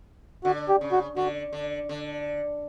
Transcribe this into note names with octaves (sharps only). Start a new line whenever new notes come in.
D3 F#4
G4
C#3
F#4
D3 F#4
D3
D3